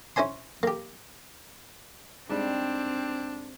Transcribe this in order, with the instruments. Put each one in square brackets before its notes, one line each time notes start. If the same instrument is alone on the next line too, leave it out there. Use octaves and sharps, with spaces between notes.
[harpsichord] C#4 E4 C5 G#5 C6
A#3 G4
[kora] G#2 G3 [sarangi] C4 [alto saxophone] D4